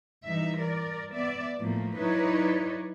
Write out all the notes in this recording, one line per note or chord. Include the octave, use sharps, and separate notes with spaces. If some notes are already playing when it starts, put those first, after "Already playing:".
E3 G3 D#4 E5
A#4 D5
B3 D5 E5
A2 F3 A3 A#3
F#3 D#4 E4 B4 C#5 D5